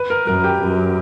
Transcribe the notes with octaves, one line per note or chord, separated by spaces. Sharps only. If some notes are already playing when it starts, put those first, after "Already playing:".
Already playing: B4
A#4
F#2 A#4
G4
F#2